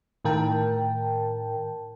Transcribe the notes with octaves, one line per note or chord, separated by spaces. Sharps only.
A2 D#3 A#4 G5 A5